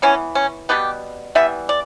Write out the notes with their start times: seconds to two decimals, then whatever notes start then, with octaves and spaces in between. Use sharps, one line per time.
0.02 E3 B3 C#4
0.35 C#4
0.69 B2 G3 B3 G4
1.35 E3 G3 B3 E5
1.69 D5